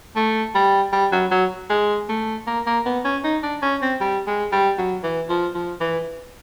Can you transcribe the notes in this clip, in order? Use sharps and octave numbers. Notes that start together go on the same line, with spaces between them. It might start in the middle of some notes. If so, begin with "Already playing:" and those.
A3
G3
G3
F#3
F#3
G#3
A3
A#3
A#3
B3
C#4
D#4
D4
C#4
C4
G3
G#3
G3
F#3
E3
F3
F3
E3